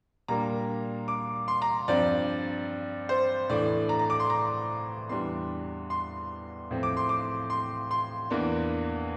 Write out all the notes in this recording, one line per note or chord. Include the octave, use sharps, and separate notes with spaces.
A#2 G3 A#3 D4 A#5
D6
C6
A#5
G2 F3 C4 D5
C5
A2 E3 A3 D4 D5
A#5
A#5
D6
C6
A#5
E2 E3 G3 D4 C6
C6
A2 F3 C4
D6
C6
D6
C6
C6
E2 E3 A#3 D4